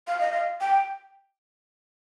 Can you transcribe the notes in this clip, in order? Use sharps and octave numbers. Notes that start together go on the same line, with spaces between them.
F5
D#5
F5
G5